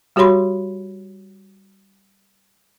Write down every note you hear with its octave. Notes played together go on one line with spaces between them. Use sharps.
G3 F#4 G4 C#5 B5 C6